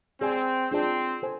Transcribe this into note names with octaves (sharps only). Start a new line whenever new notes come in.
C4 G#4 D5 G#5
C4 D4 F4 G#4 D5 A5
A4 C5 G#5